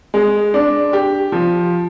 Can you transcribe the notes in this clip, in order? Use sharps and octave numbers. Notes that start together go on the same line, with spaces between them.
G#3
D4
G4
F3